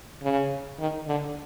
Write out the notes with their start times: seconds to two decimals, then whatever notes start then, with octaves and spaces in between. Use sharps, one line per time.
0.22 C#3
0.79 D#3
1.07 D3